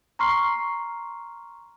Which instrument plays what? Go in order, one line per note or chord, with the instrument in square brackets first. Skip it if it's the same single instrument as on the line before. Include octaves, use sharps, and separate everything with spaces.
[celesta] A#5 C6 C#6 F6 C7